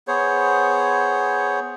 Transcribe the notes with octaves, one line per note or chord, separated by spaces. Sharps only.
B3 G#4 C5 C#5